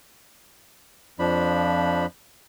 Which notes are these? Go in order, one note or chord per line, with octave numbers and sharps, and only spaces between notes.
F2 F3 D4 B5